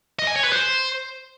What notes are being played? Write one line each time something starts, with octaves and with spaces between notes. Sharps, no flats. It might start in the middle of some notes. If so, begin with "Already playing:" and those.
D#5
G#5
C#5
B4
C5